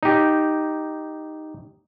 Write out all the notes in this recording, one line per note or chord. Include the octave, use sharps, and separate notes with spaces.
D#4 G4